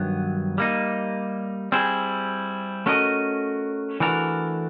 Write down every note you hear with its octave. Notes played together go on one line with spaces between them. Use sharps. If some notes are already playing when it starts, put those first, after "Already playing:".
Already playing: G2 D#3 F#3 B3
G3 A#3 D#4
G3 C4 E4 G#4
A3 C#4 F#4 A#4 D#5
E3 A3 D4 F#4 A#4